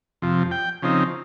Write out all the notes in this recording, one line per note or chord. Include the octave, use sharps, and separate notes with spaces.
F2 C3 F3
G5
C#3 F3 C4 D#4